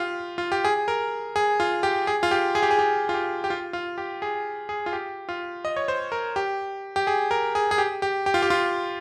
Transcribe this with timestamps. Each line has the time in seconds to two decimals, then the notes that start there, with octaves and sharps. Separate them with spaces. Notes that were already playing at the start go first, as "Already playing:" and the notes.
Already playing: F4 G4
0.38 F4
0.52 G4
0.65 G#4
0.88 A#4
1.36 G#4
1.60 F4
1.83 G4
2.07 G#4
2.23 F4
2.31 G4
2.55 G#4
2.63 G4
2.71 G#4
2.79 G4
3.09 F4
3.14 G4
3.44 G4
3.50 F4
3.73 F4
3.98 G4
4.22 G#4
4.69 G#4
4.86 F4
4.93 G4
5.29 F4
5.65 D#5
5.76 C#5
5.88 C5
6.12 A#4
6.36 G4
6.96 G4
7.07 G#4
7.31 A#4
7.55 G#4
7.71 G#4
7.78 G4
8.02 G4
8.26 G4
8.34 F4
8.42 G4
8.50 F4